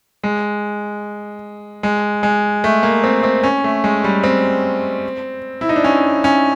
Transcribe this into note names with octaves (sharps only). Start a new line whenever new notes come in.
G#3
G#3
G#3
A3
A#3
C4
C4
C#4
A3
G#3
G3
C4
E4
D#4
D4
C#4
C#4